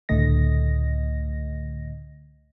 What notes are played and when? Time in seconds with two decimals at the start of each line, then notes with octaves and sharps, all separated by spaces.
0.09 C#2 A2 D3 A3 D#5 A#6